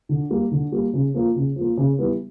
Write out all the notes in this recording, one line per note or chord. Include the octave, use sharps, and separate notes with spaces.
D3
G3 A#3
D3
G3 A#3
C#3
F3 A#3
C#3
F3
A#3
C#3
E3 G3 B3